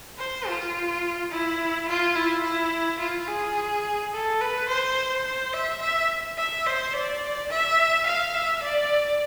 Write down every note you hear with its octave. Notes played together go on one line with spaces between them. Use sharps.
C5
F4
E4
F4
E4
E4
F4
G#4
A4
B4
C5
C5
E5
E5
E5
C5
D5
E5
F5
E5
D5